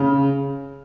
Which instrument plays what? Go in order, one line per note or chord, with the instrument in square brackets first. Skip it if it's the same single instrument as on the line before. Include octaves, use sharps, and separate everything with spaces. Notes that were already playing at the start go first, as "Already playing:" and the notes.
Already playing: [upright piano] C#3